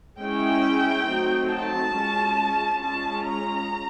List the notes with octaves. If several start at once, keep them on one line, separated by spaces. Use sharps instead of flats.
G#3 C#4 E4 G5
F#3 A3 C4 D#4
A5
G#3 C#4 F4
G#3 C#4 F4 A5
A#5